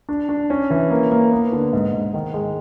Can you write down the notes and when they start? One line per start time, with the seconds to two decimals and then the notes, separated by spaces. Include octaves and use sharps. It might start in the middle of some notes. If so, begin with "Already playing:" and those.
0.09 D4
0.29 D4
0.50 C#4
0.70 E3
0.91 A#3
1.12 A#3
1.32 B3
1.52 D3
1.73 G#2
1.94 G#2
2.14 D#3
2.34 G#3